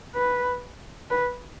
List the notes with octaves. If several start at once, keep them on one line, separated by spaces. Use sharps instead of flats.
B4
B4